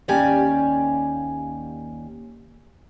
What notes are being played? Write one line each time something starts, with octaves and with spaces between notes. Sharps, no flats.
D#2 A#3 C#4 G4 D5 G#5